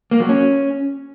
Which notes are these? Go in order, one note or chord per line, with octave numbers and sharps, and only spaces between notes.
A#3
F#3
C#4